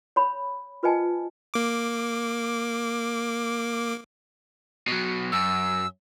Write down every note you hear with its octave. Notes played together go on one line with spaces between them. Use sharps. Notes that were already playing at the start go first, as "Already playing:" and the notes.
C#5 B5
F4 B4 C5 D#5 G#5 A5
A#3 D6
B2 F#3
F#2 E6